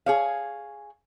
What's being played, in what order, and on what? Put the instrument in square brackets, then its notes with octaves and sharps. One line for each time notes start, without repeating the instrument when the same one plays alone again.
[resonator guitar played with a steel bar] G#4 C#5 F5